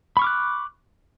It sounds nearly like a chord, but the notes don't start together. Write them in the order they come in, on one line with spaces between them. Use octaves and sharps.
B5 C#6 F6 D6 F#6